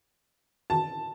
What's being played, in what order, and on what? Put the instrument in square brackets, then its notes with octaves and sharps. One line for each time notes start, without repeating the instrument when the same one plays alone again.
[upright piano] A5